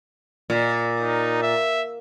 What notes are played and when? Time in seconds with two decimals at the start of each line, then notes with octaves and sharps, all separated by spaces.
0.50 A#2
1.01 D#4
1.42 E5